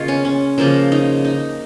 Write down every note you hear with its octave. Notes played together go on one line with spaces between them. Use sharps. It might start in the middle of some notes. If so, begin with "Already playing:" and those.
Already playing: C#3 A#3 F4 C#5 D#5
C#4
C#4
C#3 F3 A#3 A#4
D#4
D#4